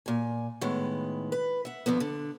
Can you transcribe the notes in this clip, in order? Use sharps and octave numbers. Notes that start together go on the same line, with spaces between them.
A#2 G#5
A2 D#3 G#3 B3
B4
E5 F#5
F2 D3 F3 B3
D3